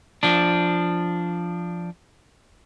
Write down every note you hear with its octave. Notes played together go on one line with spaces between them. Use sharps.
F3 D4